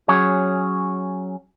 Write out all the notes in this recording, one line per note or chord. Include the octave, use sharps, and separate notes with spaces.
F#3 C#4 G#4 C#5